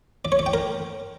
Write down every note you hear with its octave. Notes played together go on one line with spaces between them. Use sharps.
D5
C#5
D5
G5
A#4